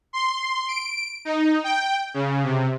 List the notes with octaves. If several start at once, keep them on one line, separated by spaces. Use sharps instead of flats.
C6
D7
D#4
G5
C#3
C3